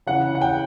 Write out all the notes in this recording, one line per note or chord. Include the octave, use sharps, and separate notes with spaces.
C#3 E3 F#5
F#5
G5